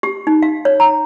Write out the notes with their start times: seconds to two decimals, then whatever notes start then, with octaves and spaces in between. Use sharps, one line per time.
0.03 G4
0.27 D#4
0.42 F5
0.65 C#5
0.80 A#5